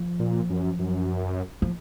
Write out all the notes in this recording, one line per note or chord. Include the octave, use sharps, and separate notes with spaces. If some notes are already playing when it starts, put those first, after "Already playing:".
Already playing: F3
A#2
F#2
F#2
F3